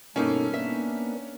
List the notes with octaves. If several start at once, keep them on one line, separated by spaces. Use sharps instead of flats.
G2 B2 A#3 C#4 D#4 A4
A#3 B3 D4 E5